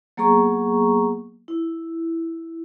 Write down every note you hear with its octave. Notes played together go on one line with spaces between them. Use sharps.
F#3 A#3 B3 G#4 A#5 C#6
E4